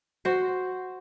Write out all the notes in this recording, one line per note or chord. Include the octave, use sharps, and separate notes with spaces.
F#4 C5